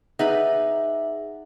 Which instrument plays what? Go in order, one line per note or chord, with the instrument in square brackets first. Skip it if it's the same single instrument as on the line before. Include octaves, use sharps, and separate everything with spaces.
[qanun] D#4 B4 B5 [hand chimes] G#4 E5 F#5